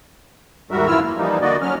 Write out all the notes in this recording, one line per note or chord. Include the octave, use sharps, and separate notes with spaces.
D#2 G#2 G3 F#4 A#4 E5
F#2 E3 E4 F4 E6 F6
A#3
E3 F3 G3 A#3 D#4
D3 A#3 F#4 D5 D#5
F#3 C#4 F6